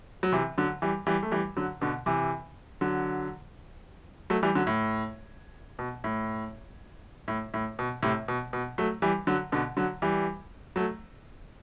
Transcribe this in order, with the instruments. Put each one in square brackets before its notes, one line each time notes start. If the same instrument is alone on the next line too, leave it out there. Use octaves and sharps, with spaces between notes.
[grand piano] F#3
C3 E3
D3 F#3
E3 G3
E3 G3
A3
E3 G3
D3 F#3
B2 D3
C3 E3
D3 F#3
F#3 A3
E3 G3
D3 F#3
A2
B2
A2
A2
A2
B2
A2 C3
B2
B2
F#3 A3
E3 G3
D3 F#3
B2 D3
D3 F#3
E3 G3
F#3 A3